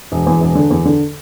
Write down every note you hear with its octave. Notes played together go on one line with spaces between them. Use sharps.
E1
E2
E1
D3
E2
D3